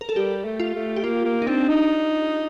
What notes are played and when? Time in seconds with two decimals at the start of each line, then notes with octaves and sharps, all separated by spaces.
0.01 A#4
0.09 A4
0.16 G3 G4
0.45 A3
0.60 F4
0.74 A3
0.96 G4
1.04 A#3 F4
1.25 A#3
1.42 D#4
1.47 C4 D4
1.68 D#4